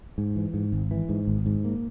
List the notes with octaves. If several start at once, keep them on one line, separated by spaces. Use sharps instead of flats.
G#2
E3
G#2
G#1
E3
G#2
G#1
G#2
A#3